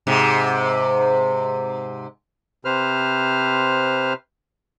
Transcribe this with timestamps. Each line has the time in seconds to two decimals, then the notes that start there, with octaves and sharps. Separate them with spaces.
0.07 G#2 C3
2.65 C3 B4 C5 F6